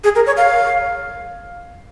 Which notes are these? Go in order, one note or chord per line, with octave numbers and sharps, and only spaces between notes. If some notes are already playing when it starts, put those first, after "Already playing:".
G#4
A#4
C#5
F5